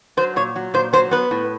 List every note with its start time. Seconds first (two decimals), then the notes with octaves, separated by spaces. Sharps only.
0.17 F#3 C5
0.36 A#2 C#5
0.56 F#3
0.74 A#2 C5
0.93 F#3 C5
1.11 B3 B4
1.31 A2